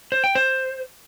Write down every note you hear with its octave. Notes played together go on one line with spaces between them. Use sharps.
C5
G5
C5